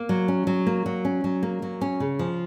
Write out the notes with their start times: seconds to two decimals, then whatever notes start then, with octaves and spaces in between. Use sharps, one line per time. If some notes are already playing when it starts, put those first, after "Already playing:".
Already playing: A#3
0.09 F#3
0.28 C#4
0.47 F#3
0.67 A#3
0.86 F#3
1.05 C#4
1.24 F#3
1.43 A#3
1.62 F#3
1.81 C#4
2.00 C#3
2.19 F3